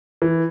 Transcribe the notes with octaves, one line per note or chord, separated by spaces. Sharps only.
E3